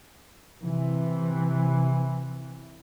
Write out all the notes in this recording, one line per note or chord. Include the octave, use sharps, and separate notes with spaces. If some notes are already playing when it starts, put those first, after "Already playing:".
C3 E3